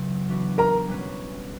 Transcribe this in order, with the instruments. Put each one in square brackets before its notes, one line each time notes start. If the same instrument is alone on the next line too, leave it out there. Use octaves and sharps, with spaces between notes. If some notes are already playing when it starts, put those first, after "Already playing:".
Already playing: [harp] E2 C#3 F#3
E3 B3 D4 F#4 B4
[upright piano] A#4 A#5
[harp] B2 G3 C#4 F#4 B4